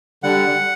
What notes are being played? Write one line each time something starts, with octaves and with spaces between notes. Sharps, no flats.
D3 G3 F#5